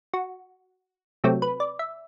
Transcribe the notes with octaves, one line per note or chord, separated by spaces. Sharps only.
F#4
C3 F#3 A3 C4 G4
B4
D5
E5